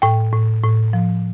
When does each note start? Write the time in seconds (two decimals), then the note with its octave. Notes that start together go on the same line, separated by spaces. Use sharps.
0.02 A2 G5
0.33 A2
0.63 A2
0.93 F3